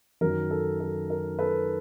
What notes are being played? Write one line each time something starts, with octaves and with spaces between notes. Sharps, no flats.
F#2 D#3 F#3 A#4
A4
A4
A#4
A4 B4